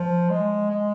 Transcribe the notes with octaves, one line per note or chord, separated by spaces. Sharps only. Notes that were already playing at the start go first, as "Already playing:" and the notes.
Already playing: F3
G#3
G#3